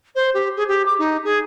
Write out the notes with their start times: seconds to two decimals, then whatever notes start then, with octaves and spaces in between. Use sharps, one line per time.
0.15 C5
0.34 G4
0.56 G#4
0.68 G4
0.85 D6
0.98 D#4
1.24 G#4